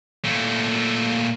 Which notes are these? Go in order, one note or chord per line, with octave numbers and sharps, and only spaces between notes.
A#2 A3